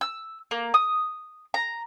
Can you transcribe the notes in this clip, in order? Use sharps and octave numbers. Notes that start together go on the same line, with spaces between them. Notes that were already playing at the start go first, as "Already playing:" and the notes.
E6
A#3
D#6
A#5